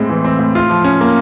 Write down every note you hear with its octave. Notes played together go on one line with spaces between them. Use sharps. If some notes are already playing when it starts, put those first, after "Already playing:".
Already playing: A2 G#3 C4
E3
C4
A2
F4
F3
C#4
A#3